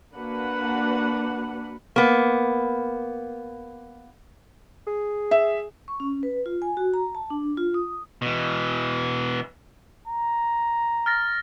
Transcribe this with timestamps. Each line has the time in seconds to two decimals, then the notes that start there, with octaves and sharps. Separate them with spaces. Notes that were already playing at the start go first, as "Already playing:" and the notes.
0.14 A#3 D4 F#4 B4 F#5
1.96 A#3 B3
4.87 G#4
5.31 E5
5.88 C#6
6.00 C#4
6.23 B4
6.46 F4
6.62 G#5
6.77 F#4
6.94 A#5
7.15 A5
7.30 D4
7.57 F4
7.74 D#6
8.22 B2 E3
10.07 A#5
11.06 F6 A6 A#6